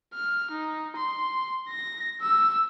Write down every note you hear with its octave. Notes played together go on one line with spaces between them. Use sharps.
F6
D#4
C6
A#6
E6